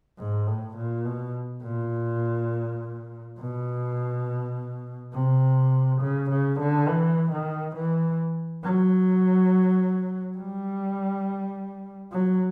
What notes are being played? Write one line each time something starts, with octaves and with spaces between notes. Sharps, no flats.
G#2
A2
A#2
B2
A#2
B2
C3
C#3
C#3
D3
E3
D#3
E3
F#3
G3
F#3